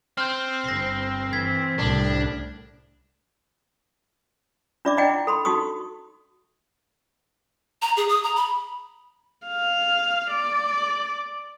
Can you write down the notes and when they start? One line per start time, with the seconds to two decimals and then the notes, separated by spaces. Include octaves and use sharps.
0.17 C4 F6 G6
0.64 G1 A#6 C7
1.33 E3 G#6 B6
1.79 C2 A2 D4
4.85 D4 F4 D5 E5 D6
4.97 D4 E4 D#5 F#5 G5
5.10 E4
5.27 A4 B5 C6
5.45 D#4 F#4 A4 C#6 D#6
7.82 A#5
7.97 G#4
8.09 D#6
8.23 A#5
8.36 B5
9.48 F5
10.32 D5